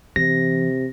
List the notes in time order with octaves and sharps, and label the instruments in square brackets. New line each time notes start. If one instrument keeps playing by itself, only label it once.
[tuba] C3 [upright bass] E3 [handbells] A#6